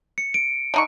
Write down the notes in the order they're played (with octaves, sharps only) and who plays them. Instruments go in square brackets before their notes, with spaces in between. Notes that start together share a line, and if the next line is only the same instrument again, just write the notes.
[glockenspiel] C#7
D7
[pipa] D3 D#4 C#6